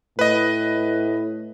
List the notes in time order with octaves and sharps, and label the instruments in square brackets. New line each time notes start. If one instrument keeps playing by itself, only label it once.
[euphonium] A2 [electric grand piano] B4 D#5